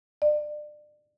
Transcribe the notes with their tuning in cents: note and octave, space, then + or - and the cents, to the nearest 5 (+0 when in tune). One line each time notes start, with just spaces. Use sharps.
D5 +30